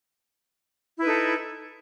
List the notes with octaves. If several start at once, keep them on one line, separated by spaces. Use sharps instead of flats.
D#4 E4 A4 B4